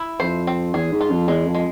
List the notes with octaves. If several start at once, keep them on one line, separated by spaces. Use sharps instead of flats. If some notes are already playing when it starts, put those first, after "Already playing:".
Already playing: E4
F2 C5
C4
E2 G#4
G#2
F4
F2
E2 G#3
F2
G#3